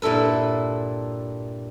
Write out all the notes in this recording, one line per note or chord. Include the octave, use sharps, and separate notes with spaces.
G2 A#2 E4 A4 B4